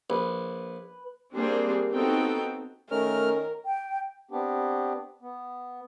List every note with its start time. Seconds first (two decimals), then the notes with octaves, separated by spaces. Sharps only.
0.10 A#1 B4
1.34 G3 A#3 C4 D4 G#4 C5
1.91 B3 C4 D#4 F#4 A4 G5
2.91 D#3 A3 C#4 A#4 F6
3.66 G5
4.31 B3 C4 D4 G4
5.22 B3